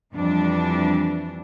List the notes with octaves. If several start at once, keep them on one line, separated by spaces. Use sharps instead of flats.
F2 E3 G3 D4